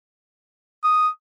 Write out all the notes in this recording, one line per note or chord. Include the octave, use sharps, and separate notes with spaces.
D#6